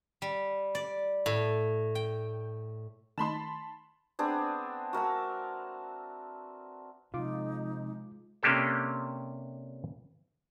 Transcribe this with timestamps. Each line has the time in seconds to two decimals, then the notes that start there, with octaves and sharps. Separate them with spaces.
0.22 G3
0.75 D5
1.26 A2
1.95 G5
3.18 D#3 A3 D#4 A5 B5 C6
4.19 B3 C4 D4 G#4
4.93 F#4 A#4 E5 A5
7.14 C3 F3 G#3 D#4 F4 D6
8.43 C3 A#3 C#4 D4 G4 A4